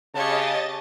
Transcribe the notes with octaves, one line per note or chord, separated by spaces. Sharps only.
C#3 G4 C#5 D#5 A5 A6